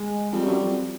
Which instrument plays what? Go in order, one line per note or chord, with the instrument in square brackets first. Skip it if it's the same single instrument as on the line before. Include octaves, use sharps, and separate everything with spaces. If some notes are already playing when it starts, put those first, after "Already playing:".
Already playing: [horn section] G#3
[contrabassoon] F2 [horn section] G3
[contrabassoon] F#2
F2